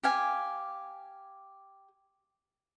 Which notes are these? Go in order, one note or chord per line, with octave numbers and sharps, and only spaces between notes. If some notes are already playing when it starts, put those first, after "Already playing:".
G4 F5 G#5